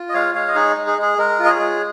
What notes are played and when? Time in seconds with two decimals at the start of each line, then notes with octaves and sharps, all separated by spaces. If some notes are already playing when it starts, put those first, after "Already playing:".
Already playing: F4
0.09 D#5
0.13 G#3 C#5 F5
0.35 G#3 C#5 F5
0.48 D#5
0.55 D#4 G#4 C#5
0.77 G#3
0.87 G#4
0.98 G#3 G#4
1.18 G#3 A#4
1.39 F4
1.45 D#5
1.49 G#4 C#5
1.59 G#3